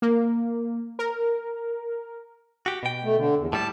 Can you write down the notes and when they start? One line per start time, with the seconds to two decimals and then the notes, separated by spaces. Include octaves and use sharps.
0.02 A#3
0.99 A#4
2.66 F#4 G4
2.83 B2 G5
3.04 A3
3.16 D3
3.37 E2
3.53 A2 G3 A5